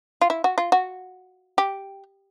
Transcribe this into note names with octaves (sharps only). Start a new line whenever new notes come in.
F4
E4
F#4
F4
F#4
G4